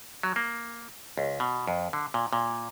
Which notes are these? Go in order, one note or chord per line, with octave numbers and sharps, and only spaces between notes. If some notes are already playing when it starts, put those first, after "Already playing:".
F#3
A#3
C#2
B2
F2
D3
A#2
A#2